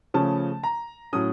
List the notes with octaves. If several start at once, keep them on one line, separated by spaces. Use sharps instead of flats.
C#3 F3 A3 C#4 A5
A#5
A2 F#3 A3 C#4 D#6